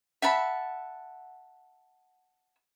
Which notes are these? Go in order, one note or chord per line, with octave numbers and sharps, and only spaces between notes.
E5 F#5 A5 B5